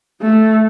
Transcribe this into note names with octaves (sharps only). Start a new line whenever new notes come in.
A3